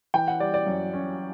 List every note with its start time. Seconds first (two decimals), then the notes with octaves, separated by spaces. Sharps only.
0.14 E3 G5
0.28 F#5
0.40 G3 D5
0.54 D5
0.67 F#2
0.93 C#4